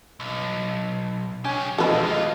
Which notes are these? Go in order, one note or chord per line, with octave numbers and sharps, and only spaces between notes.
B1
C#3 C#4 G4 G#5
A#1 B2 G#3 A#3 D#4 A4 B4
D#2 F4 D#5